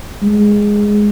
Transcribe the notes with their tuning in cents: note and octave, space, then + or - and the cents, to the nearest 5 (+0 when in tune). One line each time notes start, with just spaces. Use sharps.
G#3 -5